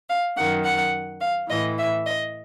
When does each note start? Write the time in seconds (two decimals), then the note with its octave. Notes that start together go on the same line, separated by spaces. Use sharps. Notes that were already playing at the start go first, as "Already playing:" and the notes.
0.09 F5
0.36 F#2 D#3 F#5
0.64 F#5
1.21 F5
1.49 A2 E3 D#5
1.78 E5
2.06 D#5